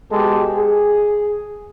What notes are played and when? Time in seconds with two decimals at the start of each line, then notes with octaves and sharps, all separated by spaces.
0.12 B2 G#3 G4 A4
0.57 G#4